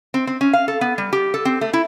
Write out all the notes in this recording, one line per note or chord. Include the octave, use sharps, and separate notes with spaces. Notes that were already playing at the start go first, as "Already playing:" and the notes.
C4
C4
C#4
F5
A4
B3
G3
G4
A4
C4
A3
E4